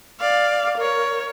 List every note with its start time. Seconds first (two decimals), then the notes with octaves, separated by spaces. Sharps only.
0.20 D5 F5
0.77 A#4 C#5